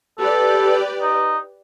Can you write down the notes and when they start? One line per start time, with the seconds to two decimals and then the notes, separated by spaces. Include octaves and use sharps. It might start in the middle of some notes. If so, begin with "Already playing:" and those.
0.18 G4 A4 B4 D5
1.02 D#4